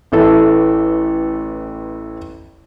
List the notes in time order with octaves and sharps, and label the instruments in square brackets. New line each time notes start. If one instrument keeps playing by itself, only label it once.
[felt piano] A1 E3 A4 E5